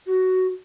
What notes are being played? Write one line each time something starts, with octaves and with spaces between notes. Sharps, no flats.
F#4